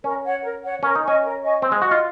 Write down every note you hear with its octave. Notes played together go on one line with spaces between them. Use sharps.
C#4 A#4
C#5 F#5
A#4
C#5 F#5
C#4 A#4
D#4
C#4 D#5 G#5 C#6
A#4
D#5 G#5 C#6
C4 C5
G#3
F#4 D#5 F#5
F4